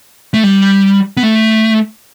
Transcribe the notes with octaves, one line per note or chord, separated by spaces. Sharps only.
A3
G3
B3
A3